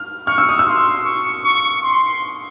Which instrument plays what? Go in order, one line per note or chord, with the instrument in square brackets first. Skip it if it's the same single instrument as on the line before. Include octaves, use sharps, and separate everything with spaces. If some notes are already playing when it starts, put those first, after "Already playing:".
Already playing: [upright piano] F6
[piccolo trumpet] C#6 [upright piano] F6
[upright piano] E6
D#6
E6
[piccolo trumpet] C6
C#6
C#6
C6